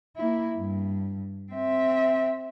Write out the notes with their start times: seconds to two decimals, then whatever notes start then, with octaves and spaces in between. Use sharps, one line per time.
0.16 A#3 E4
0.57 G2
1.53 C4 E5